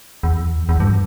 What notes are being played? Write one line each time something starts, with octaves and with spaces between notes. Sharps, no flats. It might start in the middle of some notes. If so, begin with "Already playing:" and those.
E2
E2
G2